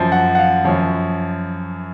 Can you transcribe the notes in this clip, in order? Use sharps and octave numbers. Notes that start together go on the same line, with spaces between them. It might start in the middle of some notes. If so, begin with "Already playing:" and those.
Already playing: F#2 F3
F#5
F#5
F5
F#2 F3 C#5